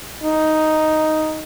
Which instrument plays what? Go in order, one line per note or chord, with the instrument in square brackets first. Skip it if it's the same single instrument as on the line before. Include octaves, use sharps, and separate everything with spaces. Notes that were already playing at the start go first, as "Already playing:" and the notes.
[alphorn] D#4